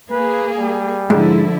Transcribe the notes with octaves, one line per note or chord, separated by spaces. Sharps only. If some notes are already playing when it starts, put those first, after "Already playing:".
A#3 G#4 B4
G3
G#2 D3 F3 E4